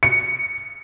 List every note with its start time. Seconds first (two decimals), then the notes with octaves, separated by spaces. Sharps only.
0.03 C#7